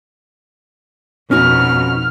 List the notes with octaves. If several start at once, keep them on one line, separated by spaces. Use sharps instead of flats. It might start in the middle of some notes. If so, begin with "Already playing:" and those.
F2 B2 C#4 D#4 F#4 F6